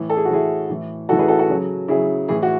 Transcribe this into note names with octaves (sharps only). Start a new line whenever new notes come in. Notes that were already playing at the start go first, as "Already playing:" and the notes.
Already playing: A2 E3
A4
G#4
F#4
A2 E3 E4 G#4
A2 E3
A2 E3 F#4 A4
G#4 B4
F#4 A4
F#4 A4
C#3 F#3
C#3 F#3 E4 G#4
A2 E3 E4 G#4
F#4